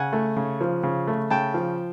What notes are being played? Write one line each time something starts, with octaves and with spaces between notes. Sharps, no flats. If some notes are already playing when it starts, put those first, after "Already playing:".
Already playing: C#3 F#5 G#5
A3
C#3
F3
C#3
A3
C#3 G5 A5
F3